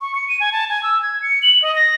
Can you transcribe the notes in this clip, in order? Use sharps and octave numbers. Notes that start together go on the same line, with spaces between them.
C#6
C#7
D#7
G#5
A5
G#5
E6
G#6
C#7
F#7
D#5
A#6